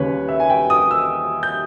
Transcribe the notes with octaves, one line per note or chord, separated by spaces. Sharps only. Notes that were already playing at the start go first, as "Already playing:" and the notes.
Already playing: D#2 C#3 G3 C#4 B4 C#5
E5
G#5
G5
D#6
E6
G6